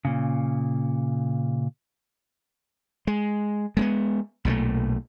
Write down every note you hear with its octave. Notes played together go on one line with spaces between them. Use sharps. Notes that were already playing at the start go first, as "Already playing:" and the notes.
A#2 C#3
G#3
G#3 A#3 B3
B1 A#2 F#3 A3